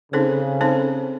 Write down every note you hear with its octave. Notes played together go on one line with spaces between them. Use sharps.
C#3 C4 D#4 A4 C5
C4 D#4 A4 C5